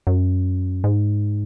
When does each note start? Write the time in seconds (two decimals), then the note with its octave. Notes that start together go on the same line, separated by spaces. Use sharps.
0.07 F#2
0.84 G#2